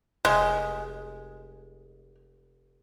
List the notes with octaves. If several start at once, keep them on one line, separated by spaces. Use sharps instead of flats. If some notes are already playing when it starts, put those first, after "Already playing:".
F1 G#3